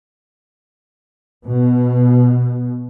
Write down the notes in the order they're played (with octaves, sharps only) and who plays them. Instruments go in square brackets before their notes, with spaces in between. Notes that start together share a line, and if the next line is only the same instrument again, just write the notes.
[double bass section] B2